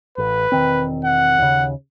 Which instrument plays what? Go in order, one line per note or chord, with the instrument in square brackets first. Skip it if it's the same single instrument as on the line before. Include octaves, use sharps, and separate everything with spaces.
[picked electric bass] A1 [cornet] B4
[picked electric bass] E1 D#3 C4
[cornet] F#5
[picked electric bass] D#2 C#3